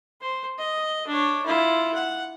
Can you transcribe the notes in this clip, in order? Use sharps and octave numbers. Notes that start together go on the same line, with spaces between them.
C5
D#5
D4 C#5
E4 F4
F#5